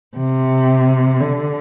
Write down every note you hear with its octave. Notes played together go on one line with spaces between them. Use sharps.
C3
D3